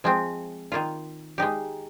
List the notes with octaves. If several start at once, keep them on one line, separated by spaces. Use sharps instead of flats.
F3 G#3 C4
D#3 A#3 F4
G#3 D#4 G4